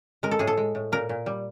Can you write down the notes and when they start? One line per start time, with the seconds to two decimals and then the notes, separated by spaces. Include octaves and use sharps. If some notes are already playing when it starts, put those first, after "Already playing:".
0.23 G#3 A#4
0.31 A4
0.39 A2 G#4
0.47 A4
0.57 G#3
0.75 A2
0.92 A#2 A#4
1.09 A#2
1.26 G3